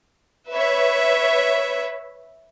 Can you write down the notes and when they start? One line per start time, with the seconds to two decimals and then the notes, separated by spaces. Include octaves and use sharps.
0.51 B4 C#5 E5